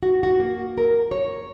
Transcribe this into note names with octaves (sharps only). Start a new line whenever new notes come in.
F#4
F#4
A#3
A#4
C#5